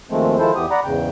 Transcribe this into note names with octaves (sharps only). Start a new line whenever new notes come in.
D#2 D#3 F3 G#3 A3 C4
D#3 F3 G#3 E4 A4 C5
E2 E3 B3 G4 D#6
D5 F#5 A#5 B5
E2 G#2 C#3 G5